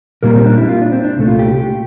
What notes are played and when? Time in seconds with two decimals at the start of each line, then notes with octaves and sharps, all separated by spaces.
0.23 A#2 G3 A#3 A#4
0.35 C4
0.46 D4
0.58 E4
0.69 F4
0.81 D4
0.92 C4
1.04 D4
1.16 C2 A#2 A3
1.28 F4
1.39 G4
1.51 G4